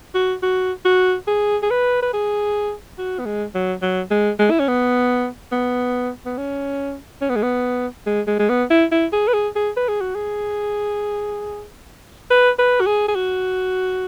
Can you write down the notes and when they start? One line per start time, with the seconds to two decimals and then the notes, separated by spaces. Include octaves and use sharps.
0.14 F#4
0.43 F#4
0.85 F#4
1.27 G#4
1.63 G#4
1.70 B4
2.02 B4
2.13 G#4
2.98 F#4
3.19 B3
3.25 G#3
3.54 F#3
3.82 F#3
4.11 G#3
4.39 G#3
4.51 E4
4.60 C#4
4.68 B3
5.52 B3
6.26 B3
6.37 C#4
7.21 C#4
7.29 B3
7.36 G#3
7.43 B3
8.06 G#3
8.27 G#3
8.39 G#3
8.49 B3
8.70 E4
8.91 E4
9.12 G#4
9.28 B4
9.34 G#4
9.55 G#4
9.77 B4
9.88 G#4
10.01 F#4
10.15 G#4
12.30 B4
12.59 B4
12.80 F#4
12.86 G#4
13.08 G#4
13.15 F#4